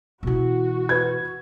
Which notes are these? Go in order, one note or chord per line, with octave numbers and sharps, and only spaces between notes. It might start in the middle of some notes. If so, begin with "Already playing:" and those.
B2 E3 F#4
B4 G#6